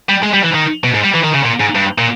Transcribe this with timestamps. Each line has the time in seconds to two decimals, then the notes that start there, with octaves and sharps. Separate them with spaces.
0.09 G3
0.23 G#3
0.33 G3
0.44 E3
0.54 D#3
0.84 B2
0.95 G#2
1.04 G3
1.15 E3
1.24 D#3
1.35 C#3
1.45 A#2
1.61 G#2
1.75 G2
1.98 A#2